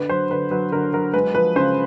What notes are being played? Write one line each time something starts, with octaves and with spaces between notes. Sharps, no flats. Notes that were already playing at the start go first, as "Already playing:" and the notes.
Already playing: D3 B4
F#3 C5
D3 B4
F#3 B4
D3 A#4
F#3 A#4
G#3 B4
F3 B4
C#3 C5